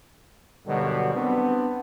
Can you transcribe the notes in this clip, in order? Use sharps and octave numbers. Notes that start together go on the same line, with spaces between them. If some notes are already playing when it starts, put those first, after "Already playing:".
G2 B2 D3 D#3 F#3 G3
B3 C4 D4